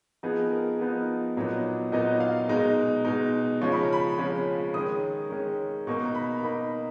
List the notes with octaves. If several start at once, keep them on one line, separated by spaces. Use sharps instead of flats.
F3 B3 D#4 G#4
A#4
F3 B3 D#4
A#2 F#3 B3 D#4
A#2 F#3 B3 D#4 D#5
F5
B2 G#3 D#4 A#5
B2 G#3 D#4
C#3 F3 G#3 C#4 C#6
B5
A#5
B5
C#3 F3 G#3 C#4
D#3 G#3 C#4 D#6
D#3 G#3 C#4
B2 A#3 D#4 C#6
A#5
B5
A#5
B2 A#3 D#4 B5